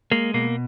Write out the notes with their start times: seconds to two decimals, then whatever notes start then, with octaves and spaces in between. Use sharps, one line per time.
0.12 G#3 A#3
0.34 B2 A#3